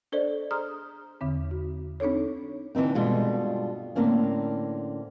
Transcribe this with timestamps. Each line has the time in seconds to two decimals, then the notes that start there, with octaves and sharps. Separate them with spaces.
0.12 D4 A4 C5 D5 D#5
0.51 G#4 A#5 C6 D#6 F6
1.21 E2 D3 C4
1.51 F#4
2.00 C4 D4 D#4 A4 C#5
2.75 D3 E3 F3 C4 D#4
2.95 G2 B2 G#3 F4 A4
3.96 A2 D3 A#3 C4 C#4